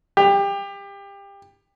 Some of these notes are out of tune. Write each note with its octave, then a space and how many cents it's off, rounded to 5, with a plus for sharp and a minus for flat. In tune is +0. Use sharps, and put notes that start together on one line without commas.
G4 +25